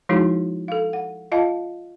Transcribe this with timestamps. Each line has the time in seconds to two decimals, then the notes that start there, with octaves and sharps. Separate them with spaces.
0.09 F3 G#3 D#4 E4 F#4 G#4
0.68 A4 F5
0.93 F#5
1.32 F4 D#5 F5 A5